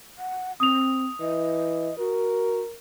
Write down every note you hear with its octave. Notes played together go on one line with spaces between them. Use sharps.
F#5
C4 D#6 F7
E3 D#5
F#4 A#4